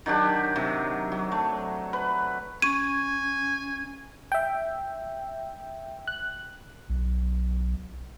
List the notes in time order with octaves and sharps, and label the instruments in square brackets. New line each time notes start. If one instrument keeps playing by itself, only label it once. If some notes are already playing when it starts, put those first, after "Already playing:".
[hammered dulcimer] D#3 F#3 D4 G4
C3 F#3
F#3
A3
B4
[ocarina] C#4 [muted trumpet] G#5 [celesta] C#6 G#6 [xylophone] D#7
[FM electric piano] E5 G5
F#6
[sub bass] B1